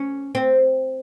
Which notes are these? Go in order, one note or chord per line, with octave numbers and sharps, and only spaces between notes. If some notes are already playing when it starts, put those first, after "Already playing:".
Already playing: C#4
C4